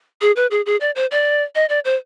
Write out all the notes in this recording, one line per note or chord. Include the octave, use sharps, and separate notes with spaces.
G#4
B4
G#4
G#4
D5
C5
D5
D#5
D5
C5